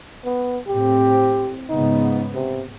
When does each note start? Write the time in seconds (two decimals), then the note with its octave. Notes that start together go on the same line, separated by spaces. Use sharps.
0.25 B3
0.68 A2 C4 G4
1.70 G#2 C#3 B3 D#4
2.35 C3